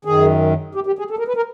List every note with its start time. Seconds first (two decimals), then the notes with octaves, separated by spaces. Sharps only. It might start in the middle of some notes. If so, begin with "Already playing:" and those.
0.05 F#2 D#3 G#4
0.75 G4
0.87 G4
0.99 G#4
1.10 A4
1.19 A#4
1.28 B4
1.37 A#4